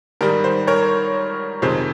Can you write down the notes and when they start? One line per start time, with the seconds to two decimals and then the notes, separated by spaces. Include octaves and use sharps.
0.21 G#2 D#3 G3 A#4
0.44 C5
0.67 A#4 C#5
1.62 F2 C3 D#3 G#3 C5